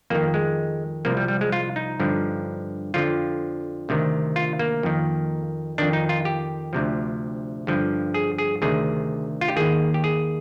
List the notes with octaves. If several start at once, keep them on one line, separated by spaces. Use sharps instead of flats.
F2 D#3 A#3
G#3
C2 C3 F3 A#3
G3
G3
G#3
F4
D#4
G2 D3 F3
F2 D3 F3 F4
D2 C3 D#3
F4
A#3
F2 D#3
F2 D#3 D4
D#4
F4
G4
D2 C3 F3
G2 D3 F3
G#4
G#4
D2 C3 D#3 G#4
F4
G4
D#2 D#3 G#4
G4
G#4